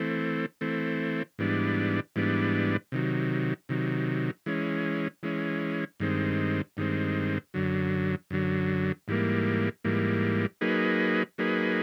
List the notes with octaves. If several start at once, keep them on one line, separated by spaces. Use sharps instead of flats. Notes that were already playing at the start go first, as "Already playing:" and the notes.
Already playing: E3 A3 C4
E3 A3 C4
G#2 E3 G3 B3 D4
G#2 E3 G3 B3 D4
C3 D#3 F#3
C3 D#3 F#3
E3 G#3 C#4
E3 G#3 C#4
G2 D#3 G#3 C4
G2 D#3 G#3 C4
F#2 D3 F#3
F#2 D3 F#3
G#2 E3 G3 A#3
G#2 E3 G3 A#3
F#3 A#3 D#4 G#4 B4
F#3 A#3 D#4 G#4 B4